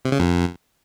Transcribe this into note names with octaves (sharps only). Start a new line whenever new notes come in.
C3
C#3
F2